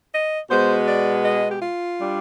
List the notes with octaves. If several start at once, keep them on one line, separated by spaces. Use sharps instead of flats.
D#5
B2 G#3 B3 C5
D5
D#5
G4
F4
G3 D4